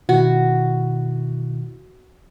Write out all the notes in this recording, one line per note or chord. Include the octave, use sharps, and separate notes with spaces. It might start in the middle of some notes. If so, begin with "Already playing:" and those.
B2 D#3 E4 F#4